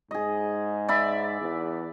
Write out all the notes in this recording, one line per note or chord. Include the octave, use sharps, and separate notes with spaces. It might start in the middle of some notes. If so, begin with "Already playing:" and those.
G#2 G#4 D#5
D5 E5 B5
E2